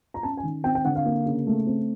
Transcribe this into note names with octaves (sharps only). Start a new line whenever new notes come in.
A#5
C#4 A5
G#5
D#3
C4 G5
G5
D3 F#5
F5
A#3
C#3
A3
C4